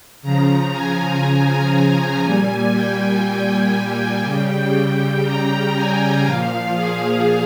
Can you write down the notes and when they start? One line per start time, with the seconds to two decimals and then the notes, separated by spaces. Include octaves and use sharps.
0.22 C#3 F3 A#5
0.72 G#5
1.72 A#5
2.23 A#2 G3 G#5
2.72 G5
3.23 G5
3.73 G5
4.23 C#3 G3 G5
5.23 A#5
5.74 G#5
6.23 A#2 F3 F5
6.73 G#4